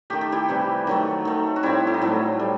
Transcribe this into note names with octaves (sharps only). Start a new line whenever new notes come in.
D#3 A3 G4
A4
E4 G4
C3 E3 G3
D#3 F#3 A3
D#3 A3
F#4
A2 G3 C4 E4
E4
D#4
A2 F#3 A3 C4
G3